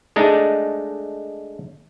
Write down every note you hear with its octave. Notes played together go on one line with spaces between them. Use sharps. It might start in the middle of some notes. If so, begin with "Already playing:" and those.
G#3 A3 D4 D#4